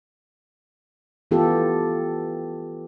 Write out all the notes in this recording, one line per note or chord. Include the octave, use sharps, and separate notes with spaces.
E3 B3 F4 G4 A4